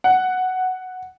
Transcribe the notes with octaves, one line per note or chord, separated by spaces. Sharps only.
F#5